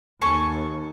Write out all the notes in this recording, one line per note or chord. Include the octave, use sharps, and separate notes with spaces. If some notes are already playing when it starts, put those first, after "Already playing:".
D#2 A4 G#5 C#6